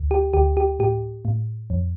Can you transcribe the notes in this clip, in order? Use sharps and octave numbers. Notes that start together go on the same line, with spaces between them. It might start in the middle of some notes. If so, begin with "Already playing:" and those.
Already playing: D2
G4
D2 G4
G4
A2 G4
A2
F2